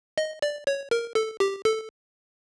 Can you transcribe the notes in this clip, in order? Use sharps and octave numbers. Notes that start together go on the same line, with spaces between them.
D#5
D5
C#5
A#4
A4
G4
A4